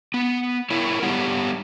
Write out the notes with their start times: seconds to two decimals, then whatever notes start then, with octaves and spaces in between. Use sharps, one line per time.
0.14 B3
0.70 E4 A#4 C#5
1.03 G3 B3 G4 C#5 F#5